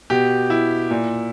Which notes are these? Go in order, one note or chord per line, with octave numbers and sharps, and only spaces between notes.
B2 G4
E4
A#2